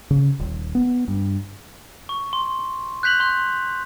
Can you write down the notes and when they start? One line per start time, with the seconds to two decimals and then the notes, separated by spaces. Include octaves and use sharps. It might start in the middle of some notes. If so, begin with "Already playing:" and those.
0.11 C#3
0.39 D#1
0.75 B3
1.08 G2
2.09 C#6
2.33 C6
3.03 F#6 G6 B6 F7 F#7
3.20 C6 F#6